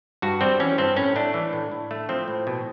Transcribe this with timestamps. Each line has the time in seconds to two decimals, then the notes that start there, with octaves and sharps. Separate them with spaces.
0.22 G2 F#4
0.41 G3 C4
0.60 E3 C#4
0.78 G2 C4
0.97 A2 C#4
1.16 A3 D4
1.34 E3
1.53 A2
1.72 A2
1.91 A3
2.09 F3 C4
2.28 A2
2.47 B2